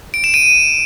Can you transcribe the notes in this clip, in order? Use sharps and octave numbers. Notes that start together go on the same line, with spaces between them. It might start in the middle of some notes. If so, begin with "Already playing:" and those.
D7
E7
D#7